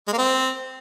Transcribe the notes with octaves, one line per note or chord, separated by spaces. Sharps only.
G#3
A#3
C4